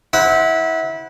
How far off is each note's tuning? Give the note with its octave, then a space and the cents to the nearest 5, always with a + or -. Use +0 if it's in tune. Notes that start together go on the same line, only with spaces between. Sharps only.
E4 -25 C5 -10 F#5 +0